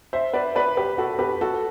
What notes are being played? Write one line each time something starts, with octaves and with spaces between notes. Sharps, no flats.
C5 E5
B4 D5
B4 D5
G4 B4
F#4 A4
G4 B4
F#4 A4